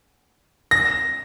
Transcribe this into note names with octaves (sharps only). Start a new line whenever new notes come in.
A#6